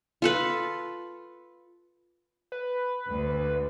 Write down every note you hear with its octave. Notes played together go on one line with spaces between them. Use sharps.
F4 A4 B4
B4
D2